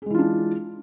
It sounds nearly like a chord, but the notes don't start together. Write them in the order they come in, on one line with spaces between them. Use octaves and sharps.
G#4 G#3 E3 F4 D4